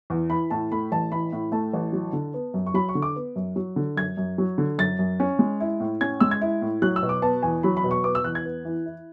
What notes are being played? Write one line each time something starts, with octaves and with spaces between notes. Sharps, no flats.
E2
E3 B5
A2 A5
A3 B5
A1 A5
E3 B5
A2
A3 A5
A1
F#3
D3
B3
F#2
C#6
F#3 B5
C#6
D3
D6
B3
F#2
F#3
D3
F#2 G#6
F#2
F#3
D3
F#2 A6
F#2
C#4
G#3
E4
A2
C#4 G#6
G#3 E6
G#6
E4
A2
F#3 F#6
E6
B2
D6
B3 A5
E2 G#5
F#3 B5
B5
B2
C#6
B3 D6
E6
E2 F#6
G#6
B3
E3
E4